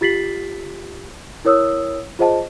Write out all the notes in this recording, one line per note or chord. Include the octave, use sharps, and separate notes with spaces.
F4 G4 A6 B6 C7 F#7
E4 A#4 C#5 D#6 E6
F4 G#4 C5 D#5 F#5 A5